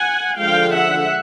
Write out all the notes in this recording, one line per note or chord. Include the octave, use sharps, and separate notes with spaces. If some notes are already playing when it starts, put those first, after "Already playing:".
Already playing: F#5 G#5
D3 F3 G#3 F5 G5
E5 F#5